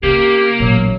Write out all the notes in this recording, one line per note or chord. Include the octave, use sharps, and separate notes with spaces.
C#3 A#3 G4
A1 A#2 F#3